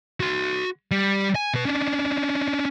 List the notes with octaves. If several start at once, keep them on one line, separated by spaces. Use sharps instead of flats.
F#4 C6
G3
G#5
B2 B4
C#4 D4